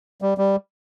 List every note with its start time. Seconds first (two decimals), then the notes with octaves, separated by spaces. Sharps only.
0.22 G3
0.38 G3